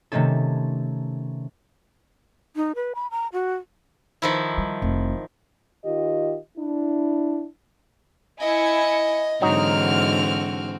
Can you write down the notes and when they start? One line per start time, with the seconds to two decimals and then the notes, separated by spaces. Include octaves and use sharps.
0.12 C3 D#3 A3 C4 C#4 A4
2.56 D#4
2.75 B4
2.95 B5
3.11 A#5
3.33 F#4
4.22 D#3 F3 E4
4.58 G3
4.82 F1
5.84 D#3 F4 G4 D#5
6.57 D4 E4
8.41 E4 D#5 G#5 C#7
9.42 G#2 D3 E3 F#3 C4 D#4 F#4 F6